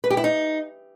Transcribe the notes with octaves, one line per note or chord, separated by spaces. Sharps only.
B4
G4
E4
D#4